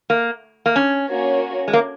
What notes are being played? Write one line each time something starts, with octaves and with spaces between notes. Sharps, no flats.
A#3
A#3
C#4
A#3 C#4 F#4 A#4 C#5
G#3
A#3